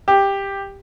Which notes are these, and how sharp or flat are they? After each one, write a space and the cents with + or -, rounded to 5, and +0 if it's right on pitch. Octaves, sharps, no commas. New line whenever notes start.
G4 +10